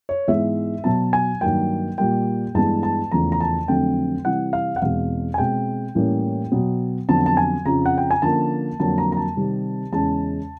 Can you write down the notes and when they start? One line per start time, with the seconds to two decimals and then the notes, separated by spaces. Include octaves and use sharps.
0.09 C#5
0.27 G#2 E3 G#3 B3 E5
0.84 B2 F#3 B3 A5
1.13 G#5
1.41 G2 D#3 F#3 A#3 G5
1.98 A#2 G3 A#3 G5
2.54 G2 E3 G#3 B3 A5
2.83 A5
3.11 E2 C#3 F3 A3 A#5
3.32 A#5
3.40 A5
3.68 F2 D3 F#3 A3 C4 G5
4.25 C3 E3 G3 C4 F#5
4.53 F5
4.76 F#5
4.82 E2 B2 G#3 C4 F5
5.34 G#5
5.38 B2 G#3 C4 G5
5.95 A2 E3 G3 A#3 C#4
6.52 B2 F#3 B3
7.09 F2 D3 F#3 B3 A5
7.26 A5
7.37 G#5
7.65 F2 C#3 F3 A#5
7.86 F#5
7.98 G5
8.11 G#5
8.22 D3 F3 A#3 C#4 A5
8.79 F2 D3 F#3 A#3 A5
8.98 A#5
9.12 A#5
9.17 A5
9.36 C3 D#3 G3 C4
9.92 E2 C#3 E3 G#3 C#4 A5